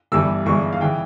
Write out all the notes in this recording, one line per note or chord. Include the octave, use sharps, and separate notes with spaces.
G1 G2 E3 G3 E6
G1 G2 E3 G#3 C#6
F5
C#3 E3 G5